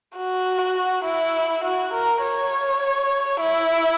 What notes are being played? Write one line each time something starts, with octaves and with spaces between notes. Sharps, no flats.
F#4
E4
F#4
A#4
C#5
E4